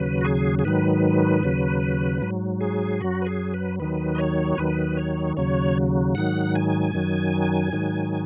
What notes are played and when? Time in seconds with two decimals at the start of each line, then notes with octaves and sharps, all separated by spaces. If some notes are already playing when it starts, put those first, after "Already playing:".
Already playing: D#2 C#3 F#3 B4
0.21 F#4
0.25 G#4
0.59 G#4
0.65 G#2 D#3 F#3 B4
1.43 D#2 C#3 F#3
2.22 G#2 F#3
2.61 G#4
3.01 F#2 F#3 F#4
3.22 B4
3.26 G#4
3.54 B4
3.80 D#2 D#3 F#3 B4
4.15 D#5
4.18 C#5
4.57 D#2 D#3 F#3 B4
4.97 C#5
5.37 D#2 C#3 F#3 C#5
6.15 G#2 D#3 F#3 F#5
6.55 G#5
6.94 F#2 D#3 F#3
7.73 G#2 D#3 F#3